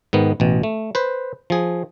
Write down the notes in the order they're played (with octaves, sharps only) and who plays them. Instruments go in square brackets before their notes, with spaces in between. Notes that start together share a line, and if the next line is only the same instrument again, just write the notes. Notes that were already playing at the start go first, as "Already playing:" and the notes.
[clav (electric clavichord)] G#2 D#3 B3
A1 B2
A3
B4 C5
F3 G#4